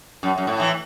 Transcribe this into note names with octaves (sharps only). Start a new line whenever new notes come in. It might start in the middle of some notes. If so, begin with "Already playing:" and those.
F#2
F#2
A2
E3